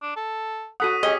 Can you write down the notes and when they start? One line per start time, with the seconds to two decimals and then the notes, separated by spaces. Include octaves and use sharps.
0.02 D4
0.16 A4
0.80 F#4 A4 F#5 D#6 B6 D#7
1.03 C#4 G4 G#4 D#5